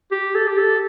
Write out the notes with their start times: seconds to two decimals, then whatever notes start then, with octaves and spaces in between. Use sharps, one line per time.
0.11 G4
0.35 A4
0.47 G4
0.58 A4